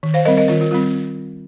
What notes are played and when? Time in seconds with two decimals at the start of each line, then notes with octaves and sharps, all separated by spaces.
0.03 D#3
0.14 C5 F5
0.25 G3 C4 A#4 D#5
0.37 A#4 D#5
0.48 D#3 F4 A#4
0.61 F4
0.71 G3 C4 F4